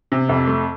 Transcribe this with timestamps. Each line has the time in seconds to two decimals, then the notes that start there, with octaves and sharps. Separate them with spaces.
0.12 C3
0.29 F2
0.47 A3